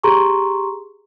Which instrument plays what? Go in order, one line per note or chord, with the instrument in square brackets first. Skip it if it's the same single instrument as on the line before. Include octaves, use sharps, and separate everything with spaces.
[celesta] G4 G#4 A#5 C6 C#6